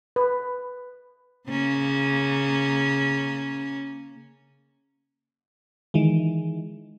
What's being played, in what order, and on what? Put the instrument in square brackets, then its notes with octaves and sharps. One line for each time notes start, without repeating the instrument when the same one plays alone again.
[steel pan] B4
[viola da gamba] C#3 A#3 C#4
[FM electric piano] D#3 E3 G#3